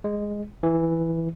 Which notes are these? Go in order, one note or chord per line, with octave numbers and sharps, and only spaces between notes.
G#3
E3